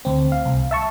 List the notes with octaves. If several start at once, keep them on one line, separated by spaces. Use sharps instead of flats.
D2 C4
F5
C2
E5 A5 C#6